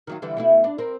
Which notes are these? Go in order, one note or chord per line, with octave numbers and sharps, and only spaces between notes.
D#3 F#3 F4
D3 E3 G3
B2 A3 E4
D4
C4 A#4